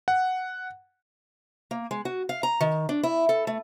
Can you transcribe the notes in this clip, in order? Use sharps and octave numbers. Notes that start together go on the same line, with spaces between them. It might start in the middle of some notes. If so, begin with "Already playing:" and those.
F#5
A#3
G#3
F#4
F5
A#5
D#3
D4
E4
A4
A3